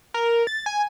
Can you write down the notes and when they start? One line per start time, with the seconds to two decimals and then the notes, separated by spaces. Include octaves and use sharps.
0.14 A#4
0.47 A6
0.66 G#5